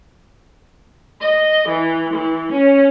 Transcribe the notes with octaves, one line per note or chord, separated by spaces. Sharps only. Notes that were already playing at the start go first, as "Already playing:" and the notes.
D#5
E3
E3
C#4